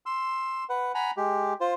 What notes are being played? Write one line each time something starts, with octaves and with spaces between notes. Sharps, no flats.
C6 E6
B4 F#5
F#5 G#5 A#5 B5
G#3 G4
F4 C5